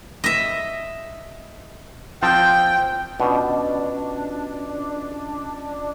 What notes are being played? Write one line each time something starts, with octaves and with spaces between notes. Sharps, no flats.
D#5 E5
F3 C4 G5 A5
B2 C#4 D4 F4 D#5